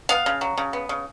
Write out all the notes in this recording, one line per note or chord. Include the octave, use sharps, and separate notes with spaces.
B3 F5
C#3
F#3
C#3
B3
C#3